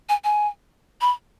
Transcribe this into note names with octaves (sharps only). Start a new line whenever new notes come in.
G#5
G#5
B5